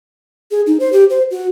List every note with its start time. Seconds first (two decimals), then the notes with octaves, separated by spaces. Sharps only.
0.51 G#4
0.67 D#4
0.80 C5
0.93 G4
1.10 C5
1.31 F#4